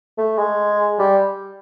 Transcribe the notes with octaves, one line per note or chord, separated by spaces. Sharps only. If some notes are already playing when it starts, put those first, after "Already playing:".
A3
G#3
G3